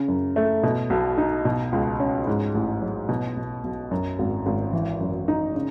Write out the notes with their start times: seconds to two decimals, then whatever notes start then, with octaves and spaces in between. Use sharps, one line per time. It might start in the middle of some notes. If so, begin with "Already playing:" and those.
Already playing: C#3
0.08 F#2
0.36 A3
0.63 B2
0.90 B1
1.18 D#4
1.45 B2
1.72 C#2
2.00 C#4
2.27 G#2
2.54 A1
2.82 F#3
3.09 B2
3.37 B1
3.64 B1
3.91 F#2
4.19 G#1
4.46 G#1
4.73 E3
5.01 F#2
5.28 D#4
5.55 C#3